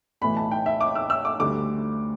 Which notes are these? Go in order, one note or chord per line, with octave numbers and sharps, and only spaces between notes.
B1 A2 E3 A3 B5
A5
G5
E5
D6
E6
E6
D6
D2 D3 G3 D6